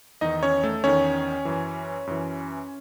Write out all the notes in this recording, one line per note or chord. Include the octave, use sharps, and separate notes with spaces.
E2 D#3 D#4 D#5
C#4 C#5
A3 A4
E2 D#3 C#4 C#5
F#2 E3
F#2 E3